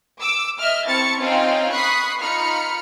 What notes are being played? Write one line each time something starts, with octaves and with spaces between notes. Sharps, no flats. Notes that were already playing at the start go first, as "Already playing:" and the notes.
D6 E6
D#5 E5 F6
C4 E4 A5 C#6 A6 C#7
C4 C#4 D#4 F4 F5 G5
B5 C#6 D#6 F#6 B6 C7
D#4 F4 B5 F6 C#7